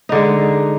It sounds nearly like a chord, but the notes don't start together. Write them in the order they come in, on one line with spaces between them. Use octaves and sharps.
D#4 D3 G#3